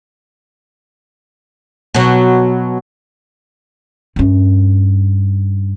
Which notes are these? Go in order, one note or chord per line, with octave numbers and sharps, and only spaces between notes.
B2 F#3
G2 C#4